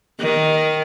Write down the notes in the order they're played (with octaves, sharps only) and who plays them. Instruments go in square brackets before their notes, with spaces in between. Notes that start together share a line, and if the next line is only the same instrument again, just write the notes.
[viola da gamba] D#3